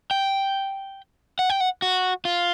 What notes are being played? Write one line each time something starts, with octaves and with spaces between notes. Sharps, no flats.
G5
F#5
G5
F#5
F#4
F4